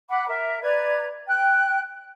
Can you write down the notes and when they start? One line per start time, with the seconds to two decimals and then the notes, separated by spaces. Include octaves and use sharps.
0.09 F#5 B5 D6
0.28 A#4 E5
0.62 B4 D5 A#5 G#6
1.27 G5 F#6